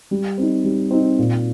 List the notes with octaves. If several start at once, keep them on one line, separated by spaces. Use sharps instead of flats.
G3
C4 D#4
G3
C4 D#4
A#2